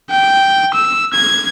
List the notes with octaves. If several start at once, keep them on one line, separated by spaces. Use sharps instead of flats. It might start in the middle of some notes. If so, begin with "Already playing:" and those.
G5
E6
G#6